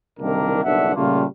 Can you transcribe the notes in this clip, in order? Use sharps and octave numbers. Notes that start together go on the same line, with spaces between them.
F#1 C2 D#3 A#3 D4 A#4
F#1 B1 G2 D4 E5 F#5
A#2 C#3 G3 A3 A#3 F4